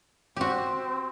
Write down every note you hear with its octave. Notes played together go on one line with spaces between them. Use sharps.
C4 F#4 G4